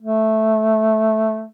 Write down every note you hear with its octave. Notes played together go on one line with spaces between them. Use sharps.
A3